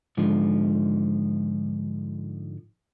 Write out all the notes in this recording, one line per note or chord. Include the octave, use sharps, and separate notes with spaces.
G#2 D3 F3